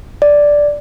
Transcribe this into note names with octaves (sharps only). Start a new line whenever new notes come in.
D5